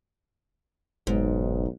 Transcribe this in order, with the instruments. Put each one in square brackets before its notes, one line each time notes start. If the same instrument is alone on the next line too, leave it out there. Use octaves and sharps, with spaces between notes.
[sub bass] F#1 [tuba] B1 [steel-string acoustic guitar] G#2